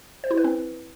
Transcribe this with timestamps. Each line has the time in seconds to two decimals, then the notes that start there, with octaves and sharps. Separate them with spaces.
0.24 C5
0.31 E4
0.37 B4
0.44 C4